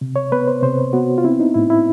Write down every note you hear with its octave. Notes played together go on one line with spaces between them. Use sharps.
C3
C#5
B3 B4
C5
C3 C5
B3 F#4
F4
C4 E4
D#4
A2 E4
E4